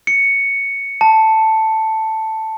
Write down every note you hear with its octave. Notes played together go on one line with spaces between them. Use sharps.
C#7
A5